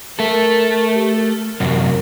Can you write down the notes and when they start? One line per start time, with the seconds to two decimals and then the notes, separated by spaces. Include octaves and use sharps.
0.19 A3 A4 A#4
0.95 G4
1.15 A#4
1.60 F#2 C3